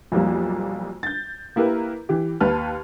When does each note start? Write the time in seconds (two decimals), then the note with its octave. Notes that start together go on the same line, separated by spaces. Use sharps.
0.12 B1 F2 F3 G3 A#3
1.03 G6 A6
1.56 A#3 E4 G4 A#4 B4
2.09 E3 G4
2.41 D#2 B4 A5 F6